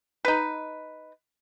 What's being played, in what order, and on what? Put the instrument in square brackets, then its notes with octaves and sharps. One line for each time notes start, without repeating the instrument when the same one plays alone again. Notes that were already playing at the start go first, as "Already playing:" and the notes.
[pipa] D#4 B4